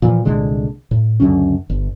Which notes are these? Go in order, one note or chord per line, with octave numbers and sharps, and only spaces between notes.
A#2 E3 F3
C2 A#2 D3 G#3
A2
C#2 F#2 D3 C#4
G1